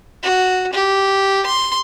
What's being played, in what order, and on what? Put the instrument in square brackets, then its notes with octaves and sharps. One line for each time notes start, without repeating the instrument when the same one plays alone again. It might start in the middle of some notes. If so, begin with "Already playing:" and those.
[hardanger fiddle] F#4
G4
C6